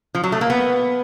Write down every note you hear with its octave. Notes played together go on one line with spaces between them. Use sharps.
F3
F#3
A3
A#3
B3